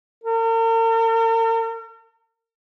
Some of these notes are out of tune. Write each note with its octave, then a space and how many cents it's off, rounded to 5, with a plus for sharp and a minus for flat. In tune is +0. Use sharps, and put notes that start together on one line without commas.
A#4 -45